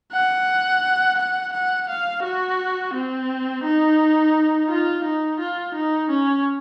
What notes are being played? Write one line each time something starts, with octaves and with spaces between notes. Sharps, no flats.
F#5
F#5
F#5
F5
F#4
C4
D#4
F4
D#4
F4
D#4
C#4